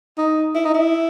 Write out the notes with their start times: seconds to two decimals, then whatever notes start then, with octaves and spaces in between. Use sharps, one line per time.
0.18 D#4
0.55 E4
0.65 D#4
0.74 E4